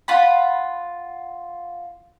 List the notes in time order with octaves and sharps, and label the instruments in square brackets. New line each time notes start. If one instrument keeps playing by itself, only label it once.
[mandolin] F4 F#5 B5